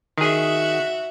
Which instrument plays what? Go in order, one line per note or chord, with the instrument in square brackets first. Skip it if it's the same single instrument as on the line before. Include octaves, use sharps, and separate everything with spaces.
[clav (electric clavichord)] D#3 G#4 [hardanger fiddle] F#4 E5